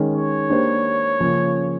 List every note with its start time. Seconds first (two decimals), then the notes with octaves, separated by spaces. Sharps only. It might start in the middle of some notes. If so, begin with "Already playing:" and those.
Already playing: D#3 G#3 C#4
0.14 C#5
0.50 A#3 D4 G4 C5
1.20 C#3 F3 A#3 C#4 F4